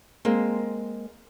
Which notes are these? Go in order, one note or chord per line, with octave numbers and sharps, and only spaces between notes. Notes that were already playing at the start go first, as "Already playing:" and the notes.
G#3 A#3 C4